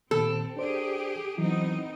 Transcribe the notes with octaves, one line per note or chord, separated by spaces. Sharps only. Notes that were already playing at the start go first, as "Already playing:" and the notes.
A#2 D#3 C4 A4
D4 G4 G#4 C5 D5
E3 F#3 B3 C4 D#4 E4